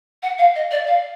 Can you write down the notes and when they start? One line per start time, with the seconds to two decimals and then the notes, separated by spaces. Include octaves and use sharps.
0.23 F#5
0.38 F5
0.55 D#5
0.71 D5
0.86 F5